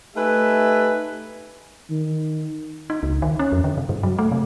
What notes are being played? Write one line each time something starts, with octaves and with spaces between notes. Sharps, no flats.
A3 D#4 G4 B4 E5 G#5
D#3
D#4
C#2
D#3
C#4
F2
D3
C3
G2
F#3
A3
C3